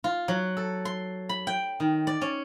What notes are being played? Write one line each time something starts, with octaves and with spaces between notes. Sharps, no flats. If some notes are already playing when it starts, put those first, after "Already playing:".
F4
F#3
A4
C6
B5
G5
D#3
D5
C#4